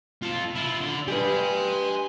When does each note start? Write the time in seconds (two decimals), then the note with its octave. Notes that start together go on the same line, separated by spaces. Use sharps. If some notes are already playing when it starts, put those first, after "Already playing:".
0.23 F4 A4
0.56 E4 F4
0.81 D3
1.08 G4 B4 G#5 C6